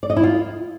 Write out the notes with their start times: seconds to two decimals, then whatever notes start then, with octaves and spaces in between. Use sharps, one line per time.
0.03 D5
0.10 D#5
0.17 E4
0.23 F4